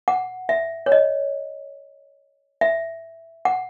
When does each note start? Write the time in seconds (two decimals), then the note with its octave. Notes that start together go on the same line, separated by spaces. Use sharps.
0.08 F#5
0.49 E5
0.86 C#5
0.92 D#5
2.61 E5
3.45 F#5